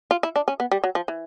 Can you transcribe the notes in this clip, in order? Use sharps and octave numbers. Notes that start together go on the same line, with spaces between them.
F4
E4
D4
C#4
B3
G3
F#3
F3
E3